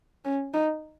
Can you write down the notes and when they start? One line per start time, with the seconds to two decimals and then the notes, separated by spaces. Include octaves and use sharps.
0.25 C#4
0.54 D#4